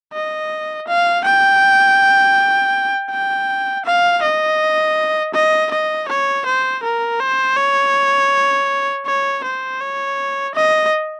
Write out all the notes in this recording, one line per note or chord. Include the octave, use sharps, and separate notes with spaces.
D#5
F5
G5
G5
F5
D#5
D#5
D#5
C#5
C5
A#4
C5
C#5
C#5
C5
C#5
D#5